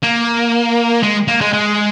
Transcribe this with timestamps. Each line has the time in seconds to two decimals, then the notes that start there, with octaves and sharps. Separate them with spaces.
0.03 A#3
1.03 G#3
1.28 A#3
1.41 G#3
1.53 G#3